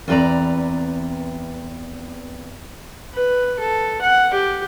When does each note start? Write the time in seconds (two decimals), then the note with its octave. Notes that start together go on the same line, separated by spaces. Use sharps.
0.08 E2 C4 B4 D5 A#5
3.14 B4
3.60 A4
4.02 F#5
4.34 G4